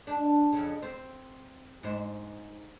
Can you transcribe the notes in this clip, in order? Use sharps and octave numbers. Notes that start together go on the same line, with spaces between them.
D4
F2 C#3
C4
G#2 C5